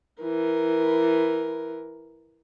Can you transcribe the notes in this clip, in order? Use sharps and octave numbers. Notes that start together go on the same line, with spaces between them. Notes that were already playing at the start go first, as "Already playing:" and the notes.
E3 A#4